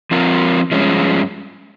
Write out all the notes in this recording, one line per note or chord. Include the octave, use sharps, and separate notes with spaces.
F3 C4 F4 A#4
G2 F3 G#3 C#4